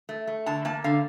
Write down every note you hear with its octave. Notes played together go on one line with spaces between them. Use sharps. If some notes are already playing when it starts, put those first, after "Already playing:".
A3
A3
D3 A5
A#3 A5
D3 F5